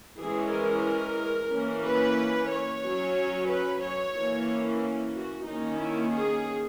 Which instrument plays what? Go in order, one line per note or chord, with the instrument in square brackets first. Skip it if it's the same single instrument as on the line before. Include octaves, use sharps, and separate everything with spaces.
[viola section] E3 G#3 C#4 G#4
A#4
E3 A#3 C#4
B4
C#5
F#3 C#4
B4
C#5
E3 A#3 C#4
F#4
D#3 A#3 C#4 D#4
E4
G#4